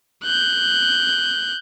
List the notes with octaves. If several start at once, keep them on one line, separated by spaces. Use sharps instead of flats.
F#6 G6